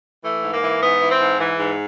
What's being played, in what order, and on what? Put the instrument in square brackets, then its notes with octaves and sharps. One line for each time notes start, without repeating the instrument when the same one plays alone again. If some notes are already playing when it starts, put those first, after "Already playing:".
[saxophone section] E3 A3
G#2
A#3
E3
G#2 B3
E3
C4
G#2
E3
G#2